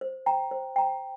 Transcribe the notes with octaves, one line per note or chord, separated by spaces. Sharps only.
C5
G5 A#5
C5
G5 A#5